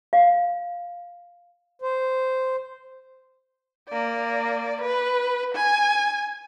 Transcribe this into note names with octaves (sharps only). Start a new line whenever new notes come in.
F5
C5
A#3 D5
B4
G#5